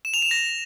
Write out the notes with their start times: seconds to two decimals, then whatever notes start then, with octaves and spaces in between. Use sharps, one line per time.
0.05 E7
0.14 F7
0.22 E7
0.31 A#6